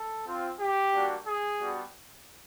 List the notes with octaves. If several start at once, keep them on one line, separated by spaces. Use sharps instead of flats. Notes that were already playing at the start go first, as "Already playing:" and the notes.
Already playing: A4
C4 F4
G4
G3 A#3 D4 F#4
G#4
G3 B3 D4 F#4